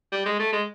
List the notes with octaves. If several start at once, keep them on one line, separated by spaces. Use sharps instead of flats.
G3
G#3
A3
G#3